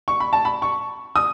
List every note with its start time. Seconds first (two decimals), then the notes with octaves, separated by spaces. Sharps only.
0.08 C#6
0.20 B5
0.33 A5
0.45 B5
0.62 C#6
1.16 D#6